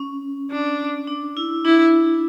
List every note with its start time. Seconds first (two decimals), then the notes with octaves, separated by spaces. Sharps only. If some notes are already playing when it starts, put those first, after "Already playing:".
Already playing: C#4
0.51 D4
1.07 D4
1.37 E4
1.65 D4 E4